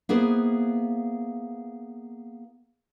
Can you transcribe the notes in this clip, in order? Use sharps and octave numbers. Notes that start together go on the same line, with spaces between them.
A#3 B3 E4 G#4 B4 C5